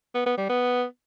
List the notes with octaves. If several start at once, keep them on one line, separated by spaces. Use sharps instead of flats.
B3
B3
G3
B3